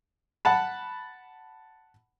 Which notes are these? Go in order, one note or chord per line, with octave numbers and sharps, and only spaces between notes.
F#5 A5 B5